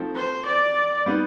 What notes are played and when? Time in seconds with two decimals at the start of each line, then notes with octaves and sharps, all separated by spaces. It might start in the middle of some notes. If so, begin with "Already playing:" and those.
Already playing: F3 A3 C4 D#4
0.15 C5
0.46 D5
1.06 G3 B3 D#4